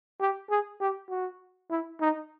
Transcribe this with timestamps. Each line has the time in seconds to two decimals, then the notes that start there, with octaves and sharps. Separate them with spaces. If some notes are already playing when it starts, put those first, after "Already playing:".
0.20 G4
0.50 G#4
0.80 G4
1.10 F#4
1.71 E4
2.01 D#4